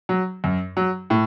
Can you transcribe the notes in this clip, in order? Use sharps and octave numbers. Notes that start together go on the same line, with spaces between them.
F#3
F#2
F#3
A2